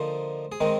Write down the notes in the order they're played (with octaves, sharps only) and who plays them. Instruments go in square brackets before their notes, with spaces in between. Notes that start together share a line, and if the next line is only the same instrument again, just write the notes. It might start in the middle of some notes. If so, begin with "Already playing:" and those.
Already playing: [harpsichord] D3 F3 A#3 D#4 C5
G#4
D#3 G#3 C4 D#4 A#4